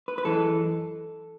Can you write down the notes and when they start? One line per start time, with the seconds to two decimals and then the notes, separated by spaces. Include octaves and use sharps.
0.08 B4
0.18 B4
0.24 F#2 E3 G#3 A4